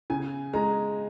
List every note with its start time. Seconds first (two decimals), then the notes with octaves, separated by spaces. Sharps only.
0.10 C#3 G#5
0.53 G#3 A#5